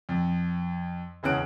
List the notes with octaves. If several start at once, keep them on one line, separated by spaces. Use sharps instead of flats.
F2
E1 E2 C#3 F#6 D7